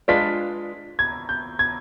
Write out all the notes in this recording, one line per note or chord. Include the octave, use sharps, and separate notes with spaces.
G#3 D4 F4 B4 D5 B6
G#6
G6
G#6